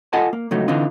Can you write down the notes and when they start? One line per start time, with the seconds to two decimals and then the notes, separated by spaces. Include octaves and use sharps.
0.13 F4 A4 D#5 F#5 G#5 A5
0.33 A#3
0.51 C#2 F#3 A3 D#4
0.68 D3 E3 C4 D4 D#4 F4